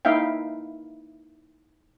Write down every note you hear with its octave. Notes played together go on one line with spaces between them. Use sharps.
A#3 D#4 E4 E5 F5 G5